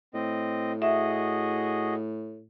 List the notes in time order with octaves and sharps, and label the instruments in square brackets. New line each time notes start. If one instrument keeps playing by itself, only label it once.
[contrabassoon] A2 [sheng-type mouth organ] C4 D#5
[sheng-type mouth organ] F#4 G#4 D#5 [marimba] E5